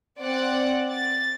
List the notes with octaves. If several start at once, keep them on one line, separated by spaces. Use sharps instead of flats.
C4 D5 F#5
A6